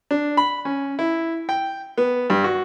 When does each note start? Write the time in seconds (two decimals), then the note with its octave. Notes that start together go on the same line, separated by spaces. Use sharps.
0.11 D4
0.37 B5
0.65 C#4
0.99 E4
1.49 G5
1.97 B3
2.30 G2
2.44 F#4